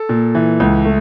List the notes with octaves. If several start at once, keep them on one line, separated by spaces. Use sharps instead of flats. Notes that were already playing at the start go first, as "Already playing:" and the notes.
Already playing: A4
A#2
E3
C#2
A3